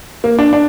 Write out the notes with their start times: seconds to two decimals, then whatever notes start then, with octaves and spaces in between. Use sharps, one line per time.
0.24 A#3
0.39 D4
0.53 D4